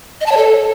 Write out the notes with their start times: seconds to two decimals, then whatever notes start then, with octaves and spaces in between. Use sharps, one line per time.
0.21 D#5
0.26 A5
0.32 C#5
0.37 A4